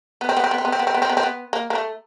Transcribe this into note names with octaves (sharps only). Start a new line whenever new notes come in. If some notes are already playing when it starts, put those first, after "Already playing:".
B3
C4
B3
C4
B3
C4
B3
C4
B3
C4
B3
C4
B3
C4
B3
A#3
A#3
A3